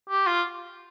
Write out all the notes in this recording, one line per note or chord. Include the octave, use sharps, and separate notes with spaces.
G4
F4